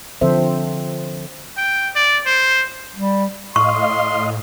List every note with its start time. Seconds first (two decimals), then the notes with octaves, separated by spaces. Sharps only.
0.21 D3 F3 C4 A4 C5 E5
1.57 G5
1.95 D5
2.26 C5
2.95 G3
3.56 A2 D#5 F5 C6 C#6